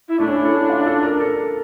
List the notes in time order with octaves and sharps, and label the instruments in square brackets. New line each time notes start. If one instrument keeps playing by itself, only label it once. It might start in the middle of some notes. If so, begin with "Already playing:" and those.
[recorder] E4
[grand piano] A3 [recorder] D4
[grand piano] C#4
E4
A4
F4
A4
A#4
A4